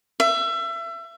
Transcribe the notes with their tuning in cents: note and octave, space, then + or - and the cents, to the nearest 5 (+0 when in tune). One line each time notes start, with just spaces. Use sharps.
E5 +30